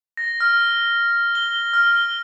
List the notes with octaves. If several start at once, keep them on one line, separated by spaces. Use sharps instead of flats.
A#6
F6
G7
F6